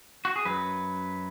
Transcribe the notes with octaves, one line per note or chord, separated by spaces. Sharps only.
F#4
G#4
F#2 F#3 B4